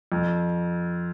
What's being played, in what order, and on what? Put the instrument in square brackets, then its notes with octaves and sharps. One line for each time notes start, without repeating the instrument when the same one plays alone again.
[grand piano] F2